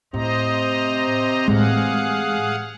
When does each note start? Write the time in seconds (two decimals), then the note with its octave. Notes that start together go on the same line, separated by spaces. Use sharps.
0.14 A2 C3 C5 D#5 A#5
1.48 A2 E3 G#3 G#4 F5 F#5